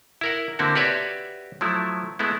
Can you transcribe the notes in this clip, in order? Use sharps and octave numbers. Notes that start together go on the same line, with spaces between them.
E4 A#4 F#5
D3 A#3 C4 E4 F#4
F#4 G4 B4 C#5 D5 E5
F3 F#3 A3 E4
G#3 A3 B3 E4